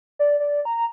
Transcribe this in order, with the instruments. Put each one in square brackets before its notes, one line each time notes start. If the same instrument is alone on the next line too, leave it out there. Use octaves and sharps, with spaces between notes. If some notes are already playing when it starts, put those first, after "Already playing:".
[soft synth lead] D5
D5
A#5